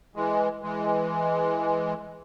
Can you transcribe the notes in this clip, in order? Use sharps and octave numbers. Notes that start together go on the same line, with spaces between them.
E3 G#3
E3 G#3